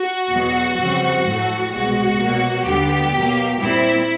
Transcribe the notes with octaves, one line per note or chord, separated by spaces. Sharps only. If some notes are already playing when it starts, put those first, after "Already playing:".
Already playing: F#4
E2 B2 F#3 B3
F2 C#3 E3 G3 C4
A2 F#3 A3
C2 B2 G#3 F#4
B2 F#3 A#3
D#2 D3 G3 B3 G4
B2 F#3 A#3
A#2 G3 C4 E4